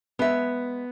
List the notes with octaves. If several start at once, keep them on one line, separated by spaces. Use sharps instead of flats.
G#3 B3 E5